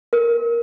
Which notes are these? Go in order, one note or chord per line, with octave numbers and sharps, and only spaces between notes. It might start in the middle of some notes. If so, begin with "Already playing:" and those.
A#4